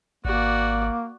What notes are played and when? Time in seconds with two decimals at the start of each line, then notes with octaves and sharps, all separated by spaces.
0.25 G#1 A#3 F#4 D5